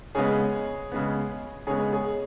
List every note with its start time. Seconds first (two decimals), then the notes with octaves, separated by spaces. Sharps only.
0.15 C#3 G#3 B3 G#4 C#5
0.92 C#3 G#3 B3
1.67 C#3 G#3 B3 G#4 C#5
1.92 G#4 C#5